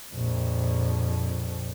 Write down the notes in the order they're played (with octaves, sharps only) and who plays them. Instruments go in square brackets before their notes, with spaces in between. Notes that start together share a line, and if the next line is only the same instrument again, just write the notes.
[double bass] A#1 F2